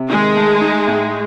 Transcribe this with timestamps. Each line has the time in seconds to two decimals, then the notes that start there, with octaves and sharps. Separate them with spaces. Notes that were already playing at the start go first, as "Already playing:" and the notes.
Already playing: C3
0.10 D#3 G#3
0.36 A3
0.61 D#4
0.87 A2